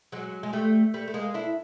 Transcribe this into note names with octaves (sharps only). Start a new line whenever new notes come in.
F#3 G#3
G#3
G3 A3
G3 A3
A3
G#3 A#3
D4 E4